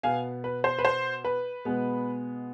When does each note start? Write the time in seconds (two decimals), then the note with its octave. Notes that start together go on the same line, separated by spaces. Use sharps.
0.03 B2 B3 F5 G#5
0.44 B4
0.64 C5
0.79 B4
0.85 C5
1.25 B4
1.65 B2 G#3 B3